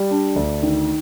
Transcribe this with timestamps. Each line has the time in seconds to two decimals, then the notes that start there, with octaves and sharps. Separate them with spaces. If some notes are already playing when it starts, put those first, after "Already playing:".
Already playing: G3
0.11 D4
0.36 D2
0.63 D#3